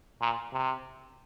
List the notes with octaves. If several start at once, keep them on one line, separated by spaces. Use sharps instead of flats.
A#2
C3